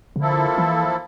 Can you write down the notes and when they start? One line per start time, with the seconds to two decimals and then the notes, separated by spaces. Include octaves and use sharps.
0.16 C3
0.20 D3 F3 A#3 E4 A4
0.58 E3